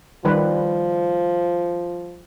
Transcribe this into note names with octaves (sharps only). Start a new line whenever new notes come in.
D#3 F3 G3 B4